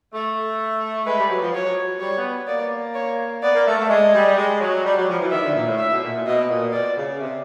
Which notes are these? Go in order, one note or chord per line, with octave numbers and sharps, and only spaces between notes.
A3
G#3 B4
G3
F#3
F3
F#3 C#5
G3 C#5
B3
A#3 D5
C#5
B3 D5
A#3
A3
A3
G#3 D#5
G3
G#3
F#3
G3
F#3
F3
E3
D#3 E5
D3
A#2
A2
E5
B2
A#2
A#2
B2 D#5
A#2
B2 D5
C#3
C3